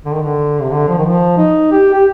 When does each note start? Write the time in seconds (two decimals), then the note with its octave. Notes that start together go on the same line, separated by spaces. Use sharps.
0.05 D3
0.14 D#3
0.22 D3
0.61 C3
0.71 D3
0.88 F3
0.98 D#3
1.06 F3
1.38 D#4
1.72 G4
1.94 G4